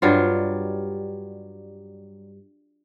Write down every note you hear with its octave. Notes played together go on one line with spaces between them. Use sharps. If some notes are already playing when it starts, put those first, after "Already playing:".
G2 F#3 G3 F4